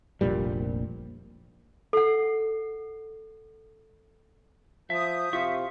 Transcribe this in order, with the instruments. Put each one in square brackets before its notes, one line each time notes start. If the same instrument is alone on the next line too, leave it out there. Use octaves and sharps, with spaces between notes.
[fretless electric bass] F1 A#1 A#2 G3
[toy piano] A4 F#5
[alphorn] F3 [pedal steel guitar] E5 [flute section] D#6 G6
[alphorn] C3 [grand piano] F4 [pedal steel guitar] E5 C#6